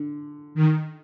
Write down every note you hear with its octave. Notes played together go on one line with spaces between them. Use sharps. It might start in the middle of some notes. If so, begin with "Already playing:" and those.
Already playing: D3
D#3